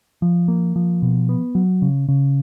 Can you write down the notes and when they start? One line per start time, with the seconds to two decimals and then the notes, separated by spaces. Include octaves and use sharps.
0.22 F3
0.48 A#3
0.76 F3
1.02 B2
1.29 B3
1.55 F#3
1.82 C#3
2.08 C#3